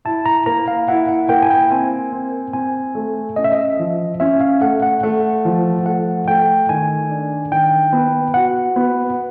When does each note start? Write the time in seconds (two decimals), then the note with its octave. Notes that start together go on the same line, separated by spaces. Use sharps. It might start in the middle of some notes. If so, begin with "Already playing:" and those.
0.05 E4 A5
0.26 A#5
0.46 A#3 A#5
0.68 F5
0.88 E4 F#5
1.08 F#5
1.29 A#3 G5
1.42 G#5
1.50 G5
1.71 C4 G#5
2.12 C4
2.53 C4 G#5
2.95 A3
3.36 C#4 D#5
3.44 E5
3.52 D#5
3.79 F3
4.20 C#4 E5
4.41 F5
4.61 A3 F#5
4.82 F#5
5.03 A3 F#5
5.45 F3
5.86 A3 F#5
6.28 A3 G5
6.69 D#3 G#5
7.10 D4
7.51 D#3 G5
7.93 B3
8.34 F#4 F#5
8.76 B3